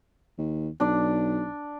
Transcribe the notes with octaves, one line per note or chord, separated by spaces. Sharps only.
D#2
B1 D4 D5